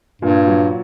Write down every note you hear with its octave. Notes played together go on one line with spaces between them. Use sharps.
G2 A#2
F#3